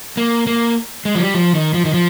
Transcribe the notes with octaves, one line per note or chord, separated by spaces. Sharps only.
A#3
A#3
G#3
F3
G3
F3
D#3
F3
D#3
F3